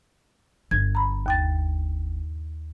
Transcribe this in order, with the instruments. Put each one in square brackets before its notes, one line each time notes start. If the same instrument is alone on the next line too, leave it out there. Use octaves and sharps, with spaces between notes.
[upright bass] G1 [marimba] G#6
[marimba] A#5 B5
D#2 G5 A6